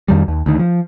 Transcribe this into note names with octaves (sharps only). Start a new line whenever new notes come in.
F2 D#3 G3
D#2
D2 D#3
F3